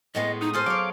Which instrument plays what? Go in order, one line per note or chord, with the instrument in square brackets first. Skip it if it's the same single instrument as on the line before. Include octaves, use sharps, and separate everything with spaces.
[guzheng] A2 G#3 B3 [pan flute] D#5
[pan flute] D#4 [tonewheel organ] D#6
[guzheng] G#4 A4 C5 [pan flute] F6
[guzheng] F#3 C#5 [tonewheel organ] F5 D6